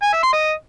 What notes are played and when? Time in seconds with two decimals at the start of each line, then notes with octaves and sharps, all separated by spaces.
0.03 G#5
0.13 E5
0.23 C6
0.33 D#5